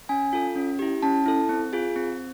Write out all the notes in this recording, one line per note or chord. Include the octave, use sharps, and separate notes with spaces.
C#4 G#5
F4 A4
C#4
E4 G4
C#4 A5
E4 A4
C4
F4 G#4
C4